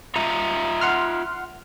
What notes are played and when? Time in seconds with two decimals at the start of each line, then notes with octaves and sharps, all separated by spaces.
0.16 F4 E5 A#5
0.81 F#5 C6 F6